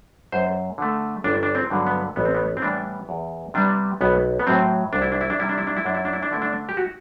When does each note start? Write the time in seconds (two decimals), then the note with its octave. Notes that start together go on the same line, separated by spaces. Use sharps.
0.32 F#2 C5
0.78 D3 A3
1.24 G1 D4
1.43 D4
1.55 C4
1.70 G2 D3 F#3 B3
1.87 B3
2.16 A1 B3
2.25 C4
2.35 B3
2.57 C4
2.62 A2 E3 G3 B3 D4
3.09 E2
3.54 C3 G3 B3 D4
4.01 B1 B3
4.40 B3
4.46 A2 F#3 C4
4.93 C2 D4
5.02 E4
5.12 D4
5.21 E4
5.30 D4
5.39 C3 G3 E4
5.49 D4
5.58 E4
5.67 D4
5.77 E4
5.84 F#2 D4
5.95 E4
6.05 D4
6.13 E4
6.23 D4
6.31 D3 A3 E4
6.42 D4
6.69 G4
6.77 F#4